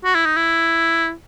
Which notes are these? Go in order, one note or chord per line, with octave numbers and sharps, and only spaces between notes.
F#4
E4
D#4
E4